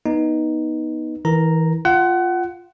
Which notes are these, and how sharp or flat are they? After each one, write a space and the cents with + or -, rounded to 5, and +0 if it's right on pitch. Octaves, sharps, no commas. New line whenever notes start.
B3 -20 D#4 +0
E3 -25 A#4 +0 A#5 +0
F4 +0 F#5 +25